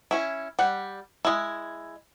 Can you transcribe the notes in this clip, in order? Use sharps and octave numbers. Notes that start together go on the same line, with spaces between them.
C#4 E4
G3 F#5
G#3 E4